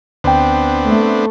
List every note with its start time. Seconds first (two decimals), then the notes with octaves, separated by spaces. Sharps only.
0.24 D2 B3 C4 D4 G5
0.85 A3